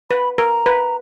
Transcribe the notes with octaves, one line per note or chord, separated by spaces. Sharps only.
B4 B5
A#4 A#5
B4